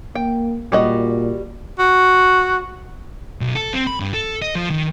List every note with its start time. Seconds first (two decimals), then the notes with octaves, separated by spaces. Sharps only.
0.15 A#3 G5
0.72 A#2 G3 F#4 D#5
1.79 F#4
3.41 B1
3.56 A4
3.73 C4
3.87 B5
4.00 G2
4.14 A4
4.42 D#5
4.55 F3
4.70 D#3